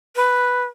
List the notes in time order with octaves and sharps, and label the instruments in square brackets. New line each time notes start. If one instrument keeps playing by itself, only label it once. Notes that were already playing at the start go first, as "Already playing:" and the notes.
[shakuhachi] B4